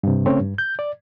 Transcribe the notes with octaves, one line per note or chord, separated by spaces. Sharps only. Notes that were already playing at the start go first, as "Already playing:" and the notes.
G2 C3
C#3 A3 C4 C#4 C#5
G2
G6
D5